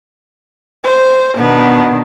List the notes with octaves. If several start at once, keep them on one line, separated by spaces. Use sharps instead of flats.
C5
B2 D#3 B3 D4